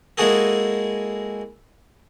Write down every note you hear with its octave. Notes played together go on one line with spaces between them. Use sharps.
G#3 A#3 E4 F#4 G#4 A4